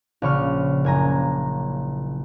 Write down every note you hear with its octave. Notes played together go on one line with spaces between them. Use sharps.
A#1 C#3 C#6 F6
F#1 G#5 A#5